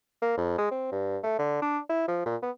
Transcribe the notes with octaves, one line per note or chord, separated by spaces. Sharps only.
A#3
F2
G#3
C4
G2
A3
D3
D4
E4
F3
A#2
B3